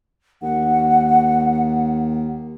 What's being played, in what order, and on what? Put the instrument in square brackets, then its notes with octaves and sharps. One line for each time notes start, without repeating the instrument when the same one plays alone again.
[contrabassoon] D#2 [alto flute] F#5